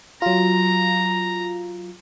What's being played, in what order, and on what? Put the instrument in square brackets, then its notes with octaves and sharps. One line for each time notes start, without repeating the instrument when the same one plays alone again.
[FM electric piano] F#3 F4 [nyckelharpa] A#5